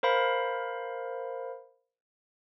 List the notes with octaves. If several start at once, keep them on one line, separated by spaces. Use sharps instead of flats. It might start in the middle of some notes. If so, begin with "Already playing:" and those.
A#4 C5 F5 B5